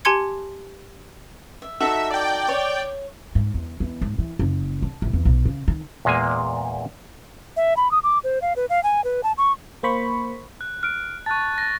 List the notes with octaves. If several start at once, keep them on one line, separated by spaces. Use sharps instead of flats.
G4 G#5 A5 C6 G#6 C#7
E5
D#4 F#4 A4 E5
D5 G5
C#5
G#2
E2
E2
G#2
E3
F#1
D4
A1
E2
B1
C#3
D#3
E2 A#2 G#3 A#3 G#5
E5
B5
D#6
D6
C5
F5
B4
F5
G#5
B4
A5
C#6
A#3 C5 B5 C#6
F#6
F6 F#6 D7
A5 C#6 F#6 A6
A6 A#6